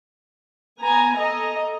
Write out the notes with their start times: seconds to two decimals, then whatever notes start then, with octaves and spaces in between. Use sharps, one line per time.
0.79 B3 G#5 A#5
1.15 A4 D#5 A#5